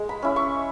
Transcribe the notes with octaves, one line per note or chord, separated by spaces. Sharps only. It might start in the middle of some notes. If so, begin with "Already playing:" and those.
Already playing: G#3
B5
C#4 E4
C#6